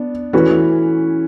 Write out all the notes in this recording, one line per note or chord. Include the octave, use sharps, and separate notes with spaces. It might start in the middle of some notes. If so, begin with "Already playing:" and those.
Already playing: B3 D4
E3 A3 C#4 F#4 B4